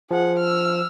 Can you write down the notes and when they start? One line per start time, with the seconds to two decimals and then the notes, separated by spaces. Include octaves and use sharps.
0.11 F3 G#4 F#5
0.40 E6 F6